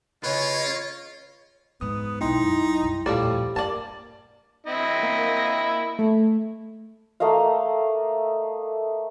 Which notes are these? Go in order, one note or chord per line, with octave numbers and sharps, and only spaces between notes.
C#3 F4 B4 C#5 D#5
E2 G#2 B3 D#6
B1 E2 D#4 E4 G5 C6
F#2
C2
D#1 F2 A2 F3 G3 G4 D5
G2 A#3 D5 A5
C4 E4 D#5
A#3
A3
A3 A#3 D#5 F5